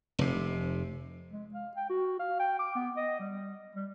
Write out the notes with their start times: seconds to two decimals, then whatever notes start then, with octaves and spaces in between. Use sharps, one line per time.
0.19 F1 C3
1.32 G#3
1.54 F5
1.76 G5
1.90 F#4
2.19 F5
2.40 G5
2.59 D6
2.75 B3
2.97 D#5
3.19 G3
3.75 G3